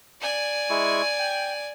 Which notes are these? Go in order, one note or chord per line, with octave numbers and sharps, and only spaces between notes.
D5 G#5
G#3 E4 C#6
G5